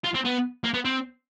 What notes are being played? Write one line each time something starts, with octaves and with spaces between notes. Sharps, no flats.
F4
C4
B3
A#3
B3
C4